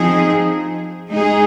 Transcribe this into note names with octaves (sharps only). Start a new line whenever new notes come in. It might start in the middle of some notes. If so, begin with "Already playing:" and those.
Already playing: F3 C4 D#4 G#4
G#3 D#4 G#4